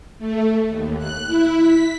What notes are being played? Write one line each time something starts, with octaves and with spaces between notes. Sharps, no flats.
A3
D#2
F#6
E4
B6